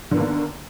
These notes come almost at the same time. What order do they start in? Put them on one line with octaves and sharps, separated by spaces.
D3 B3 D#3 A#3